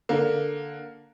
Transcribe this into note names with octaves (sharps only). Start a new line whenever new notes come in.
D3 A#3